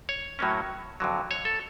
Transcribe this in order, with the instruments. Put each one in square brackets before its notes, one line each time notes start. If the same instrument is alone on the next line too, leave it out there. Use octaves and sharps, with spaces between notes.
[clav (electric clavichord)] C#5
A2 F#3 A#3 C#4
F2 D3 F#3
C#5
A4